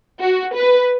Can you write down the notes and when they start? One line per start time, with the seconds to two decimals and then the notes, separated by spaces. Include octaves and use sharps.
0.21 F#4
0.54 B4